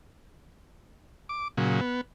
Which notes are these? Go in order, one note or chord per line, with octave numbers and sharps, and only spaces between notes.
D6
A#2 C#3 F#3
B3